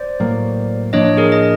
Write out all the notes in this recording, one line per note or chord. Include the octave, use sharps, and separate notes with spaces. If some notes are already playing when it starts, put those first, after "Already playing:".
Already playing: C5 D5
A2 F#3 A#3
A2 F3 A#3 D4 C#5 D#5
G#4 A#4
D#5